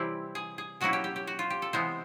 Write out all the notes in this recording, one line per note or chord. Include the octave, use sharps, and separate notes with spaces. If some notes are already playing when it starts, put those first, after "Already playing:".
Already playing: C3 E3 G3 C4 E4 G4
G#4
G#4
B2 F#3 A#3 C#4 E4 F#4
G4
G4
G4
F#4
F4
G4
A4
C3 E3 G#3 B3 C5